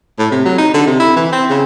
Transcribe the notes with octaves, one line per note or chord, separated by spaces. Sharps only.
A2
C3
F#3
D#4
D3
C3
E4
E3
C4
C#3